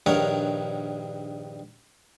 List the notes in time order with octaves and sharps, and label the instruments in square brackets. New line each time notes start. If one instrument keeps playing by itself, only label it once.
[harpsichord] A#1 G2 D#3 A#4 C#5 F#5